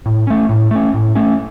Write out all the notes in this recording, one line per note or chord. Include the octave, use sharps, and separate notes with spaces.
A2
A3 C#4
A2
A3 C#4
A2
A3 C#4